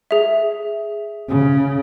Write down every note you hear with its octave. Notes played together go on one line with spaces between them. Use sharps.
G#4 E5
C#3